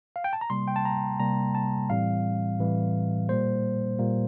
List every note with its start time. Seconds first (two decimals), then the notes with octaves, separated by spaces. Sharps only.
0.16 F5
0.24 G5
0.33 A5
0.41 A#5
0.50 C3 G3 A#3 C6
0.68 G5
0.76 A5
0.85 A#5
1.20 C3 G3 A#3 A#5
1.55 A5
1.90 A2 E3 G3 C4 F5
2.59 A2 E3 G3 C4
3.29 A#2 G3 A#3 C5
3.99 A#2 G3 A#3